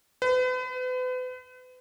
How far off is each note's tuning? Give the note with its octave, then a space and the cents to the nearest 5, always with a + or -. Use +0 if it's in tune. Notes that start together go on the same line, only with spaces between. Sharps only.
B4 +40